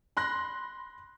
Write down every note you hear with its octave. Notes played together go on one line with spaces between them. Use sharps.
B5 C6 F#6 A#6